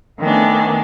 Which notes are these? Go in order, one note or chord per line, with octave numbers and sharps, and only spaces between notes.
D#3 A3 B3 C#4 D4